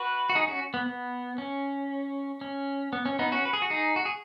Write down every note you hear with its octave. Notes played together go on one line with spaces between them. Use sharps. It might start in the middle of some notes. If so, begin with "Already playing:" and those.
Already playing: F#4 B4
F#4
D#4 G#4
C#4 F#4
B3
B3
C#4
C#4
B3
C#4
B3 D#4
C#4 F#4
B4
G#4
F#4
D#4 G#4
F#4
G#4